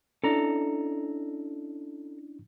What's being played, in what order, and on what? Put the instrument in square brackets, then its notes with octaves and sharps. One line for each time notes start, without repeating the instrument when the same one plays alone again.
[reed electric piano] C#4 D4 E4 [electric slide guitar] A4 A#5